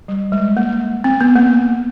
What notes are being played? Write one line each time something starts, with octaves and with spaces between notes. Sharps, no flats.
G3
G#3
A#3
C4
B3
A#3